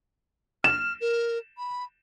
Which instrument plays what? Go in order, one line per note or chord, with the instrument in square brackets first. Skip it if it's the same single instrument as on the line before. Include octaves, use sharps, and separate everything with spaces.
[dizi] F6 [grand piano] E7
[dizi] A#4
B5